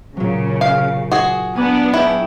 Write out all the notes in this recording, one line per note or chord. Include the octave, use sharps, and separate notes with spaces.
A#2 C#3 F#3
F5
F#4 G#4
B3 D4 G#5 A#5 D6
E4 G#4 C#5 G5